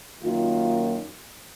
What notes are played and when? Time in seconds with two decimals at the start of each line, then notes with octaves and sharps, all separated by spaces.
0.22 F#2 D#3 A#3 F4